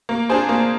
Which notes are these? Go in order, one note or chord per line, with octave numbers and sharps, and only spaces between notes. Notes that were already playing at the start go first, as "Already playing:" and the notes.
A#3
D4 G#4 C5
A#3